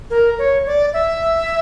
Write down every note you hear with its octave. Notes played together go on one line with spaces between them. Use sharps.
A#4
C#5
D5
E5